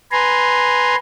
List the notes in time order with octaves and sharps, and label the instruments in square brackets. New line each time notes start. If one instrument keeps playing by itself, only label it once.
[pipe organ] B4 G#5 A#5 C6